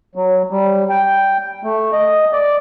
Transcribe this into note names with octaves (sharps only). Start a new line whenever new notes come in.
F#3
G3
G5
A3
D#5
D5